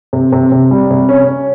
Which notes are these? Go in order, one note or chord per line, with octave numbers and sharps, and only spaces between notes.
C3
C3
C3
G3
C3
C#4
C#4